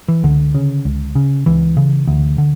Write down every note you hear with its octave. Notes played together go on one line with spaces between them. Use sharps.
E3
C#2 D3
C#3
C#2
C#3
C#2 E3
C#3
D2
D3